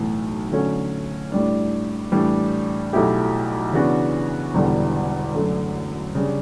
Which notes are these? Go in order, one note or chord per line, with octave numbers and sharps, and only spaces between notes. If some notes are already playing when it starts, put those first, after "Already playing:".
Already playing: B1 A2 E3
D3 F#3 A3 C#4
A2 G3 D4
A2 E3 G3 D4
B1 B2 A3 E4 G4
C#3 E3 B3 D4 F#4
E1 E2 D3 G3
F#2 D3 A3
C#3 G3 D4